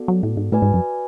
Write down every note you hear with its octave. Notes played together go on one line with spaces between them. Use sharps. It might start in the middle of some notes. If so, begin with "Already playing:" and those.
Already playing: B3 F#4 A4 D5
F#3
A2
G#2
A2 F#4 B4 D5 G#5
G#2
F#2